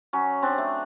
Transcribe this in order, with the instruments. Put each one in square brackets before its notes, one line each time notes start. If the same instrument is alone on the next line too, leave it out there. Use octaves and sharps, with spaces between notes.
[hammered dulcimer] F#3 C#4
C4 D4
A3